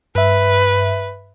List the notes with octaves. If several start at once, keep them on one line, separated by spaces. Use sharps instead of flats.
G2 B4 E5